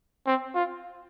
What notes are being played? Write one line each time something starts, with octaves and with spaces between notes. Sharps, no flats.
C4
F4